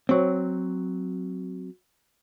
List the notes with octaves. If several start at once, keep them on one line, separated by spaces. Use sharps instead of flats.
F#3 C4